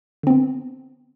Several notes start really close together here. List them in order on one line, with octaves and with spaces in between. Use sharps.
D3 C4 B3